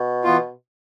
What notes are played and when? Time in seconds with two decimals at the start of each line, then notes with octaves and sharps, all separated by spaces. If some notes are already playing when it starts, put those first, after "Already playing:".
Already playing: B2
0.24 E3 B3 F4